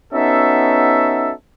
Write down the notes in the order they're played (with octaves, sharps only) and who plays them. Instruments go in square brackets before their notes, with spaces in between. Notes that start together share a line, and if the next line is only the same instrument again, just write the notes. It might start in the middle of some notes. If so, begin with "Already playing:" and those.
[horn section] B3 C#4 D#4 F#4 A4 E5